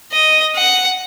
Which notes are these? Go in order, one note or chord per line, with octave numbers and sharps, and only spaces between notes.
D#5
F#5